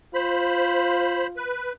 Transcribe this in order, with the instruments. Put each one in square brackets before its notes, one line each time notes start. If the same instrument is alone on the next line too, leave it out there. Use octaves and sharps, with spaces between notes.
[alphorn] F4 [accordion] C5 B5
[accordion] B4